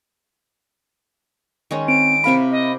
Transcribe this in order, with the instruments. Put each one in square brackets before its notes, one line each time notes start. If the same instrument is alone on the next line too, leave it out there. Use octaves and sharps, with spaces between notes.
[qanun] D#3 G#3 C#4
[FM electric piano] C4 [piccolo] D7
[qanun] C3 E4 A#4 [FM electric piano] C4 F5 B5
[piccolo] D#5